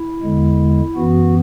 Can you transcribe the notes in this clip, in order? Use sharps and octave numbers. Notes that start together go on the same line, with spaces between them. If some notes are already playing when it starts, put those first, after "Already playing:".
Already playing: E4
E2 D3 G#3
F#2 E3 B3 F#4